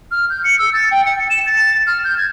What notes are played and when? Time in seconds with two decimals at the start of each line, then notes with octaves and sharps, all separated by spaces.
0.11 F6
0.30 G6
0.44 C#7
0.59 E6
0.73 A6
0.91 G5
1.06 C#7
1.30 E7
1.46 A6
1.87 F6
2.04 G6
2.18 G#6